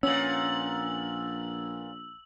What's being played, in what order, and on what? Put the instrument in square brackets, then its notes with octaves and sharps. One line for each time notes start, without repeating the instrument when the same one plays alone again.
[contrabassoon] A#1 [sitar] A#2 B3 [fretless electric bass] C#4 [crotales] E6 F#7